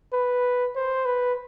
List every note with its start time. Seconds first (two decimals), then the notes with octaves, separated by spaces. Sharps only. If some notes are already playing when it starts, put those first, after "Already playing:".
0.13 B4
0.76 C5
1.06 B4